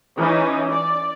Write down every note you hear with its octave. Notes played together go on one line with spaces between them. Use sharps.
E3 C#4 D#4
D5